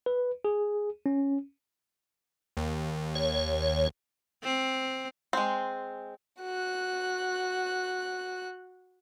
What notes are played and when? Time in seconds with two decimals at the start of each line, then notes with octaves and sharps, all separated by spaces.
0.06 B4
0.45 G#4
1.06 C#4
2.57 D#2
3.15 C#5
4.44 C4
5.33 G#3 C4
6.41 F#4 F#6